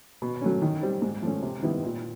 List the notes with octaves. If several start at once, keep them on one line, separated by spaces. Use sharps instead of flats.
B2
F#3 A3 C#4
D#3
G3 C4
G#2
F3 A3 C#4
C3
D#3 G3 B3 E4
A#2